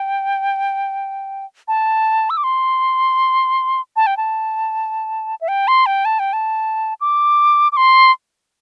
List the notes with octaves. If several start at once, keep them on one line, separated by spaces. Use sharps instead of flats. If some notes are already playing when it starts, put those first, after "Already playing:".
Already playing: G5
A5
E6
D6
C6
A5
G5
A5
E5
G5
C6
G5
A5
G5
A5
D6
D6
C6